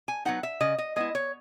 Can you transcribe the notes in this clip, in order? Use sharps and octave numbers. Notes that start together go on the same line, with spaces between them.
G#5
F#3 B3 D#4 F#5
E5
C#3 D#5
D#5
G#3 B3 E4 D#5
C#5